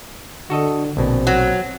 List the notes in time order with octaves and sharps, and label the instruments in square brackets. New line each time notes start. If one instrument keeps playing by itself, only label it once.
[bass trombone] D3 [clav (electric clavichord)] F#4 A4 D#5
[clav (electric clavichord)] A#1 B2 [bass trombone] C4
[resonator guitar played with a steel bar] F#3